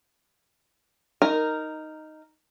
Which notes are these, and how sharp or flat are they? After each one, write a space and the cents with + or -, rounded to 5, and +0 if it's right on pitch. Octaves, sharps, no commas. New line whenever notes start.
D#4 +0 A#4 -5